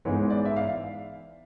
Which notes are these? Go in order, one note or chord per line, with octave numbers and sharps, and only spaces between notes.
G#2 E3 G#3 B3 C#5
D5
E5
F5